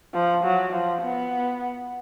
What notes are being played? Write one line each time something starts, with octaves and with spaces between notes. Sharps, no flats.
F3
F#3
F3
B3